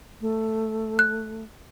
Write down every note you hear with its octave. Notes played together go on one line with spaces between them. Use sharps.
A3
F#6